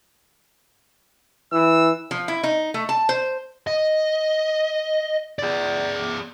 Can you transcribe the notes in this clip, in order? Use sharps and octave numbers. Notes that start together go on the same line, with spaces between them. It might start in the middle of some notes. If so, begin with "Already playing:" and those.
E3 E6
F3
E4
D#4
A3
A5
C5
D#5
G#4 D5